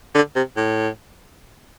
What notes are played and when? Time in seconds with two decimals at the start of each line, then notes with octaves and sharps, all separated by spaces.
0.14 D3
0.35 C3
0.57 A2